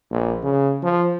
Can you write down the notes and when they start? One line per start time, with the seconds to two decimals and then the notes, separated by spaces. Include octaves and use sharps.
0.10 A#1
0.43 C#3
0.83 F3